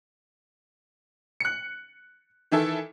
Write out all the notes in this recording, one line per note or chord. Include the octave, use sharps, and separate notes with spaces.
F#6 C#7
D#3 E3 E4 A4